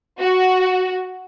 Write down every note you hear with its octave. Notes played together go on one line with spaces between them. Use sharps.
F#4